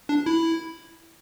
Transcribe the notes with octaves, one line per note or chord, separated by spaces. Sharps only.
D4
E4